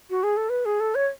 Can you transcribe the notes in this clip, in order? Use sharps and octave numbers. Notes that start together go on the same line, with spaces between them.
F#4
G#4
A4
B4
G#4
A4
C#5